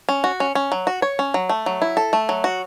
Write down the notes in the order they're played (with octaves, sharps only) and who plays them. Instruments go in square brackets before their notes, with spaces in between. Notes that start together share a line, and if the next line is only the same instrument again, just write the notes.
[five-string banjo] C#4
F#4
C#4
C#4
F#3
F#4
C#5
C#4
F#3
A3
F#3
E4
A4
A3
F#3
F#4